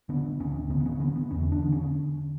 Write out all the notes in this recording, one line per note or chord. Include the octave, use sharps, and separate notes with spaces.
D3 B3
D2 C#4
D3 B3
B3
C#4
D3 B3
B3
E2 C#4
D4
D3
C#4